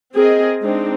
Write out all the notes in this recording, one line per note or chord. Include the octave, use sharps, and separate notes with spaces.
C4 G#4 A#4 D#5
G#3 C4 D4 D#4